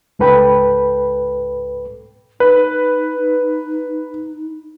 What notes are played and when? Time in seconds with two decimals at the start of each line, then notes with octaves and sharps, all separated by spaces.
0.19 C#2 G#2 A4 B4 G5 B5
2.40 D#4 B4